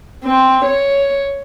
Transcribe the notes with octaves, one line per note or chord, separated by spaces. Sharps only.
C4
C#5